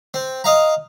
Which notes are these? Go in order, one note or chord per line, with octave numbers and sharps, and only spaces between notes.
C4
D#5 F5 A#5